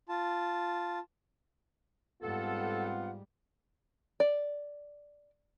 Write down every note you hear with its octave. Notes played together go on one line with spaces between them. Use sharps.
F4 A5
G#2 G3 B3 C4 F4 A4 F#5
D5